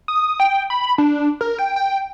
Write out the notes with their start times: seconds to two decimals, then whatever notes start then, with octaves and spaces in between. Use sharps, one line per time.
0.08 D#6
0.40 G5
0.70 B5
0.98 D4
1.41 A#4
1.59 G5
1.76 G5